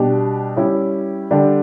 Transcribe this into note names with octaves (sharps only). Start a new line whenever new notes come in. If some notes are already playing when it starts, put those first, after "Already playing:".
Already playing: B2 G3 D4 G4
G3 C#4 E4 G4
D3 G3 D4 G4